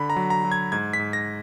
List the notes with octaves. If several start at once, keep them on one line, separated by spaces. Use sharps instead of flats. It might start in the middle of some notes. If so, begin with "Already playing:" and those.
Already playing: D3 B5
A#5
F#3
A#5
F#3
G#6
G#2 G#6
B6
G#2
A#6